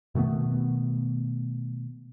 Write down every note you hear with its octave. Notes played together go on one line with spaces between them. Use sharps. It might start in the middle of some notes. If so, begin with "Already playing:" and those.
B2 D#3 A3 B3